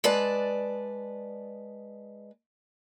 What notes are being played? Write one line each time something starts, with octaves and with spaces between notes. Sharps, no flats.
G#3 B4 D5 A5